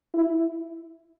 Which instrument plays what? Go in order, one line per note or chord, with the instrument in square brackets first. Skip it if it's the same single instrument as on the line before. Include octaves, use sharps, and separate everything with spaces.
[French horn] E4